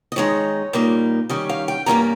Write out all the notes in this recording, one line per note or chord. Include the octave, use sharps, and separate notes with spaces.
D#5
D#3 G#3 D#4 C#5
A#2 G3 A#3 D#4
D#3 G3 C#4 D#5
F5
G5
G2 D#3 G3 A#3 C#4 A#5